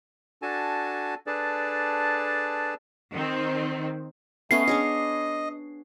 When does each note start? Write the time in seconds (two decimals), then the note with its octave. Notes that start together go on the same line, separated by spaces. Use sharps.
0.42 D4 F#4 A4 G#5 A5
1.27 D4 G#4 A4 B4 D5 A5
3.12 D#3 C4
4.51 A3 B3 C#4 D#5 C7
4.68 D4 G#4 C#5 D#5